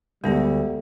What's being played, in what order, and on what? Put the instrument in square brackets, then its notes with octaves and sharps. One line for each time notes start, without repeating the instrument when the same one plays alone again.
[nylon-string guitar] D2 [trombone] G3 [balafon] G#3 B3